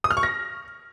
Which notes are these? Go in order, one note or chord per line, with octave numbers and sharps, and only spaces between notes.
D#6
F6
C#6
A#6